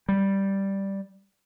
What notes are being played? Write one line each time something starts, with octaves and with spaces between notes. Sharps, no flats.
G3